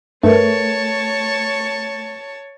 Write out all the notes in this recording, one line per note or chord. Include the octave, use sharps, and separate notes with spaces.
G2 A3 A#4 B4 C#5 A5 C#6